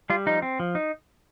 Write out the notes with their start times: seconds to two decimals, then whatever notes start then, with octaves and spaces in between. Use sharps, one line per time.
0.10 G3 F4
0.26 F3 D#4
0.42 C4
0.60 F3
0.75 D#4